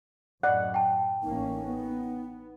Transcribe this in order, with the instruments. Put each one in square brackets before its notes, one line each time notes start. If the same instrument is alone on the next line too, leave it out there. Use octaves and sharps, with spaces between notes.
[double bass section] F#2 A2 [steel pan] D5 F#5 [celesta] D#5 F#6
[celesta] G5 A5
[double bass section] A1 A#3 C#4 [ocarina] D#4
[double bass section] B3